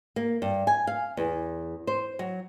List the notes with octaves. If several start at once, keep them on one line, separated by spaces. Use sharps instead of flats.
A#3
G2
G#5
F5
E2
C5
F#3